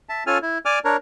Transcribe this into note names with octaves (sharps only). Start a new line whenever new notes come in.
E5 A5
C#4 F4 A4 G#5 F6
E4
D5 G#5 D6 F6
D4 A#4 C#5